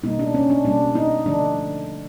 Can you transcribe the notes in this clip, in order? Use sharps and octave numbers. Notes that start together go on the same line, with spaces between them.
B2 G3 A#3 D#4
D4
C#4
D4
B2 G3 A#3 D4
D#4
D3 F3 A3 D4